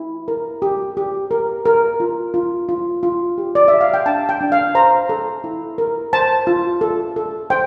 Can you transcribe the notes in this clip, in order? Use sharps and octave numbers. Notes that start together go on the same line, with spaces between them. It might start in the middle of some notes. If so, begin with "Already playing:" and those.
Already playing: E4
A#4
G4
G4
A#4
A#4
F4
F4
F4
F4
G4
D5
G4 E5
F5
G5
D4 A5
G5
D4
F5
C5 A#5
A4
E4
A#4
C5 A5
F4
A4
A4
C5 G5